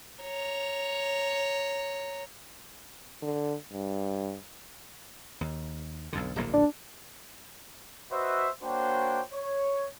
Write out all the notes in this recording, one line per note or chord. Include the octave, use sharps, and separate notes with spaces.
C#5 A#5
D3
G2
D#2
B1 F2 D3
D1 A#1 A#3
D4
F#4 B4 C5 D#5 E5
A#3 D4 F#4 C5 C#5 G5
C#5